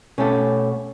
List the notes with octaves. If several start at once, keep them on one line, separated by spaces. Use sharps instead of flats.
B2 A3 C#4 G4 A4